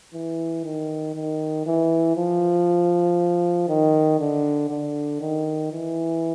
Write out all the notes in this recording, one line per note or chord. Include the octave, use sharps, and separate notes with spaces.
E3
D#3
D#3
E3
F3
D#3
D3
D3
D#3
E3